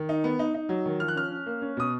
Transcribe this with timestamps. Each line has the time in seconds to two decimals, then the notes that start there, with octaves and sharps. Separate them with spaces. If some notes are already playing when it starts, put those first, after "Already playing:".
Already playing: D#3
0.09 D#4
0.24 B3
0.39 D#4
0.54 D#4
0.69 F#3
0.86 D#3
1.00 F3 F6
1.08 F#6
1.15 C#4 F6
1.30 C#4
1.46 A#3
1.62 C#4
1.77 B2 D#6